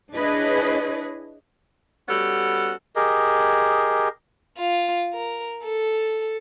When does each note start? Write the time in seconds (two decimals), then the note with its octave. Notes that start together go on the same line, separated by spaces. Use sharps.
0.13 D4 E4 G#4 B4 C#5 D#5
2.07 G3 B3 C#4 F#4 A4
2.96 G4 G#4 A#4 D#5
4.58 F4
5.14 A#4
5.64 A4